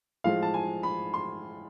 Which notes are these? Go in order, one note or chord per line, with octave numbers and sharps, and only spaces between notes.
A2 F3 G#3 F5
A5
G#5
B5
C6